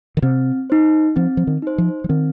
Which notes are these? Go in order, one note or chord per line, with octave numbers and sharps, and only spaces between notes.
D#3
C3 C4
D#4 C5
F3 C4
F3
D#3
D#4 C5
F3
F3
D#3 C4